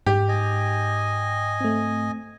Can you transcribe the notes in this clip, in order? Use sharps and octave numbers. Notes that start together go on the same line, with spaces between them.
G#2 G4
D#5 G#5
A3 C4